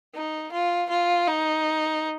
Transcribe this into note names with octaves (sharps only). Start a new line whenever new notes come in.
D#4
F4
F4
D#4